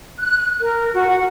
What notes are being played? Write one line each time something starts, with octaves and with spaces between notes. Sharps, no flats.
F#6
A#4
F#4
F#5